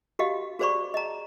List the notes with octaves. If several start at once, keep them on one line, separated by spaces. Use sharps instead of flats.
F#4 G4 D#5 F5
F#4 G#4 C5 D5 B5 C#6
D#5 A#5